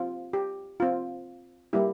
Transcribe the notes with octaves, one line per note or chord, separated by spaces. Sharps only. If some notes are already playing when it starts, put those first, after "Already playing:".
Already playing: C4 F4
G4
C4 F4
G3 A#3 E4 G4